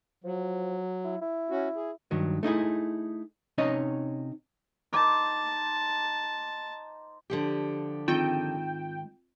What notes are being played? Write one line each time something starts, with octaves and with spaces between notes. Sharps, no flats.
F3 F#3
E4
E4
C#4 F#4
G#4
G2 D#3 F#3
A3 D#4 E4 G#4
C3 C#4 D#4 C#5 D#5
D#4 C5 A5 D6
D3 F3 G4
G#2 D#3 C4 F4 G5 E7